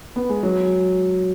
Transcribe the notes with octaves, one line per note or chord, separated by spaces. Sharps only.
B3
G#3
F#3